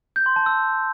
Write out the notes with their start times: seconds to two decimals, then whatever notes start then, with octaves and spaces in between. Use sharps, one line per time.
0.16 G6
0.26 C6
0.36 A5
0.46 E6